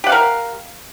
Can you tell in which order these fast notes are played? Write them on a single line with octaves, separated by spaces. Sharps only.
G4 F#5 F5 A#4